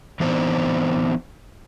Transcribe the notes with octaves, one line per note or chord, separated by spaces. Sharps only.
E3 B3 C4 D4 D#4 C5